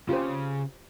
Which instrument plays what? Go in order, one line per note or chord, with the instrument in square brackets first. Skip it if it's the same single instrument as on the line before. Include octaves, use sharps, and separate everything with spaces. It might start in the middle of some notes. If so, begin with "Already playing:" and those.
[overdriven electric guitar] C#3 [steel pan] F4 G4 C5